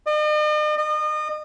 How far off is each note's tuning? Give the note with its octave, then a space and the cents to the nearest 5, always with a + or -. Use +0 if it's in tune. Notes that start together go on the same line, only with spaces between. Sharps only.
D#5 -45
D#5 -35